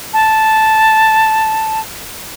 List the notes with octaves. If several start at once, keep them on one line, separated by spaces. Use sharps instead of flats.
A5